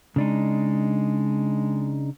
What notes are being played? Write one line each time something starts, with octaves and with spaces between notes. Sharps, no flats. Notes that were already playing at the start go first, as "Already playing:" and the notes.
C#3 G#3 D4 D#4